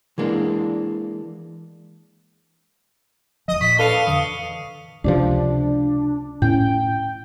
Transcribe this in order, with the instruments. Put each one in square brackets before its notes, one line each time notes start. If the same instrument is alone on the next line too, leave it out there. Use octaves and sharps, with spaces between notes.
[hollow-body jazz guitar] E3 G#3 A#3 D4
[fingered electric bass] D#1 F3 [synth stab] D#5 D#6
[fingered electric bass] A#2 [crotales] C#6 [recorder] B6
[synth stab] D4 A4 B4 [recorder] F5 [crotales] C#7 D#7 G7
[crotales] C#7
[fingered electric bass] F2 D3 E3 [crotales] D#6 C#7
[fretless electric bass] C#2 C3 F3 [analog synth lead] D4
[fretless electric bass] A2 C#4 [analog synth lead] G5